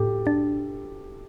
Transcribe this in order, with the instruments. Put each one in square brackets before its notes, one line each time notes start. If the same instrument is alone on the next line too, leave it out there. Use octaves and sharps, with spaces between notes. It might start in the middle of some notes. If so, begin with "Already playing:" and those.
Already playing: [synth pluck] A2 [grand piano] G4 A4
[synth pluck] D4